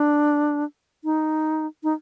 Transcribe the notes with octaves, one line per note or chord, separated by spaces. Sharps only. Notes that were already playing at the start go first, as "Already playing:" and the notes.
Already playing: D4
D#4
D#4